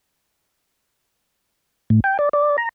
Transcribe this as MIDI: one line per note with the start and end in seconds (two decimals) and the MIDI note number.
1.90 2.00 45
2.04 2.18 79
2.19 2.29 74
2.33 2.57 74
2.58 2.69 82